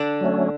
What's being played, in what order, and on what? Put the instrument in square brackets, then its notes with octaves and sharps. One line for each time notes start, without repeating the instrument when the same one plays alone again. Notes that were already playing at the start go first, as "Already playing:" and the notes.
Already playing: [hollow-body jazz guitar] D3 D4
[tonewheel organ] F#3 A3 C#4